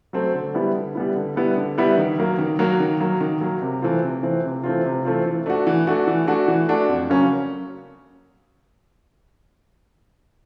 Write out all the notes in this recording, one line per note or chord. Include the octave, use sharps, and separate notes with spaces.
F#3 A3 C4
D3
G3 B3 E4
D3
G3 B3 E4
D3
G3 B3 E4
D3
G3 B3 E4
D#3
F#3 A#3
D#3
F#3 A#3
D#3
F#3 A#3
D#3
F#3 A#3
C3
E3 A3 C4 F4
C3
E3 A3 C4 F4
C3
E3 A3 C4 F4
C3
E3 A3 C4 F4
E3
A3 D4 F#4
E3
A3 D4 F#4
E3
A3 D4 F#4
E3
A3 D4 F#4
F2
C#3 F#3 A#3 C#4